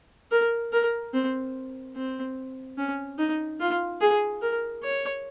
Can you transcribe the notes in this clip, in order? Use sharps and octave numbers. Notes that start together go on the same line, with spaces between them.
A#4
A#4
C4
C4
C#4
D#4
F4
G#4
A#4
C#5